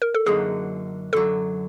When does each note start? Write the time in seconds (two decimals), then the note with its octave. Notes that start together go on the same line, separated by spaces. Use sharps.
0.02 A#4
0.14 A4
0.26 F#2 D3 F#3 A#3 D#4 G#4
1.13 F#2 D3 F#3 A4